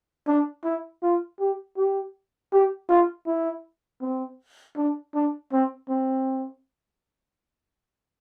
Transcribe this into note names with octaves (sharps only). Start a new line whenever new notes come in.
D4
E4
F4
G4
G4
G4
F4
E4
C4
D4
D4
C4
C4